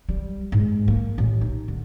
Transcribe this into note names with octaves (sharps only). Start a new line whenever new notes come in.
G3
G#2
A#3
A1
D#4
D3